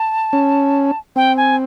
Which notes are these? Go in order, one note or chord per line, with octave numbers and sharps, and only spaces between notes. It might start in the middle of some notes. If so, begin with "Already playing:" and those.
Already playing: A5
C#4
C4 G5
G#5